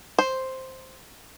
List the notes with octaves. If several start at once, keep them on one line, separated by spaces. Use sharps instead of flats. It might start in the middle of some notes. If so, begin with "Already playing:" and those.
C5